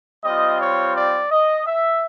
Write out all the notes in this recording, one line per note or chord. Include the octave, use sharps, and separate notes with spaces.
G3 C4 F4 D#5
C#5
D5
D#5
E5